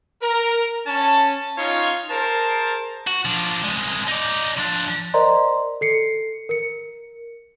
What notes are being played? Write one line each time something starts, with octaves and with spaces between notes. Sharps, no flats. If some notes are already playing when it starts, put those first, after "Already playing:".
A#4
C#4 A5
C#4 D#4 F4 C#5
G#4 A#4 C5 A5
F#4
F3 D4
C2 G#3
D#4 D5
F3 D4
A#4 C5 D5 D#5 A#5 C6
A4 C7 C#7
A#4 C#7